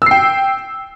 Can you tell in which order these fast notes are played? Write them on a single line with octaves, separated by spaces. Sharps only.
E6 C7 G5